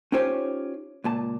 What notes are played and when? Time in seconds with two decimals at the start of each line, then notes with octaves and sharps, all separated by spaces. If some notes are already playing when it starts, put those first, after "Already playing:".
0.12 C#4 D#4 F4 G4 C5 C#5
1.04 C#2 A#2 A5